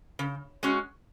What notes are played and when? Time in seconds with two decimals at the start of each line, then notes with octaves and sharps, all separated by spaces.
0.19 C#3
0.63 G#3 C#4 F#4